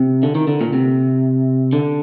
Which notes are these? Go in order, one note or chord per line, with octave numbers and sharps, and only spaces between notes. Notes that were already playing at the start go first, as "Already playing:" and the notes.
Already playing: C3
D3
D#3
D3
A#2
C3
D3